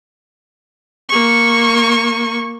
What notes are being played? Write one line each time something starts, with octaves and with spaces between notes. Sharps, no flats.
A#3 C#6